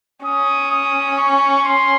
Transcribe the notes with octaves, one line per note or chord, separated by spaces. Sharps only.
C#4 D#6
D#6
C#6
C6